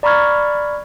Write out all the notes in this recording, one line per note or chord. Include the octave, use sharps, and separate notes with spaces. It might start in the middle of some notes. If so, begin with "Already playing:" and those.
D5 A#5 B5 C#6 F6 G#6